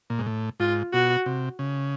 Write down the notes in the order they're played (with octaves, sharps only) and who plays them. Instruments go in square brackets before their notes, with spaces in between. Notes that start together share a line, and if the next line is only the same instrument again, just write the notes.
[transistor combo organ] A#2
G#2
A2
[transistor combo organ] G#2 [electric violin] F4
[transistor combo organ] B2 [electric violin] F#4
[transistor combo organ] C3
C#3